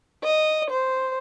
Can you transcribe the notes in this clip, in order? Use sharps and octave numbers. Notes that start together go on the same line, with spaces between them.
D#5
C5